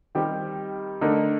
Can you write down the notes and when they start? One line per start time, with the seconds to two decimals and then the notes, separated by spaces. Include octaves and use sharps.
0.15 D#3 G3 C4 G4
1.01 D3 A3 D#4 A#4